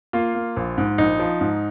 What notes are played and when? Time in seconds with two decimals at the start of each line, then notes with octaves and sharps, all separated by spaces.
0.13 A#3 F4
0.35 A#3
0.56 A#1
0.78 G#2
0.98 A#1 D#4
1.19 F3
1.41 G#2